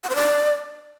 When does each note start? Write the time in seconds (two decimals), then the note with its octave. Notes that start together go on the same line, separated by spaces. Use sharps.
0.04 F#5
0.10 C5
0.16 D5